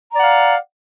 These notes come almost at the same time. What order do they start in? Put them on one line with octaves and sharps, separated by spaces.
A#5 D5 F#5 F5